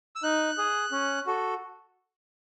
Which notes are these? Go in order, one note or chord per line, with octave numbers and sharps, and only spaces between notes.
E6
D#4 F#6
G#4
C#4
F#4 A4